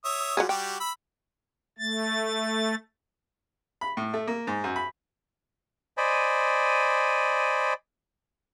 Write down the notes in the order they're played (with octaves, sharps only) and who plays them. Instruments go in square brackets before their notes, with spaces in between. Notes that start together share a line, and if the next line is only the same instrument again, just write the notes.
[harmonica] C#5 E5 D#6
[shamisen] F#3 F4 G#4 [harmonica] G3
[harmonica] G3 F#4 G4 [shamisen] G5
[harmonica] B5 E6
[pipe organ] A3 A6
[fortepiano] B5
A2
A3
A#3
G#2
F#2
B5
[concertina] C5 D5 D#5 G#5 B5